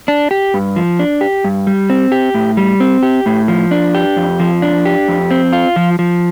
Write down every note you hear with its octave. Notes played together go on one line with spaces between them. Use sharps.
D4
G4
G2
F3
D4
G4
G2
G3
C4
G4
A2
G3
C4
G4
A2
F3
D4
G4
F2
F3
D4
G4
F2
C4
F4
F3
F3